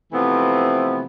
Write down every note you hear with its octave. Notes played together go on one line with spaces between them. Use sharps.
C3 E3 F3 A3 B3 C4